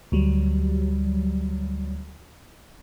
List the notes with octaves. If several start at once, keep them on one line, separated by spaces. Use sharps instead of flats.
D2 F#3 G3